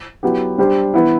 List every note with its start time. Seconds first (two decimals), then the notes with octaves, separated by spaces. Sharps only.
0.23 F#3 B3 E4 G4
0.58 G3 D4 G4 C5
0.94 E3 B3 E4